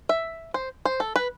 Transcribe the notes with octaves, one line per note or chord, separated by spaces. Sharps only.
E5
C5
C5
A4
B4